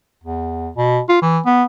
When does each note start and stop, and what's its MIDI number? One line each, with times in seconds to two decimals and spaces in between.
0.24 0.69 40
0.77 1.00 47
1.09 1.20 65
1.22 1.39 52
1.46 1.64 59